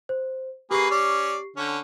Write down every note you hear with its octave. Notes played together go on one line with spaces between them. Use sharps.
C5
A#3 G4 G#4 B4 C#6 C7
C#4 D5
D3 C#4